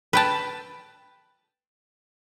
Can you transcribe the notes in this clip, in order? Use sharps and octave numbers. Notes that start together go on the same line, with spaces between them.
B4 G5 A5